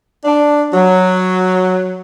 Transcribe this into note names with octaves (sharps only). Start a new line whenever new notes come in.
D4
F#3